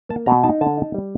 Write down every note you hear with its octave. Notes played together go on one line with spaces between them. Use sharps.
A#3 A5
B2 A#5
D#4 A5
D3 A5
D#4
G3